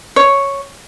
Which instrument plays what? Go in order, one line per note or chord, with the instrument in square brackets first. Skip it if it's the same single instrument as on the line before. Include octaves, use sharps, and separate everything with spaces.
[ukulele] C#5